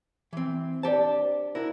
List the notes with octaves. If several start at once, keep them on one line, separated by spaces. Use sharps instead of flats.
E3 C4
D4 G4 C5 D5 A5
E4 F#4 A#4